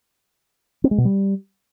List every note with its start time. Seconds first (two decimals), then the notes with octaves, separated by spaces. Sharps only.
0.84 C4
0.91 G#3
0.98 B2
1.05 G3